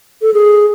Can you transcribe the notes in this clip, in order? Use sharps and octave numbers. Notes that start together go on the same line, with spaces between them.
A4
G#4